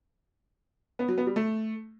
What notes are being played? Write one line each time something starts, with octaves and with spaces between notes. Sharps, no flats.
B3
F#3
B3
G3
A3